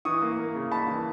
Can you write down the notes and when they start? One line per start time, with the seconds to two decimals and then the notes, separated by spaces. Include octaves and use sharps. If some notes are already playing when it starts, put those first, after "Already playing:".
0.05 E3 C#6 D#6
0.22 A#3
0.38 A#3
0.55 C#3
0.71 A#3 A5 B5
0.87 E3